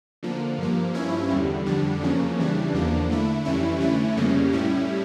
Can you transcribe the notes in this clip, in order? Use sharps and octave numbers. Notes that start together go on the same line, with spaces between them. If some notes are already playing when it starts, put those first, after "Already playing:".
D3 F3 A#3
G2 F3 A#3
G2 F3 C#4 E4
E2 D3 G3
F2 D3 G3 D4
E2 C#3 F3 A#3 C#4
C#3 E3 G3 D4
E2 D3 F3 A#3 D4
D3 A3 E4
F2 E3 G3 C#4 E4
D3 A3 C#4 E4
F2 C#3 G3 A#3 C#4
A2 G3 C#4 E4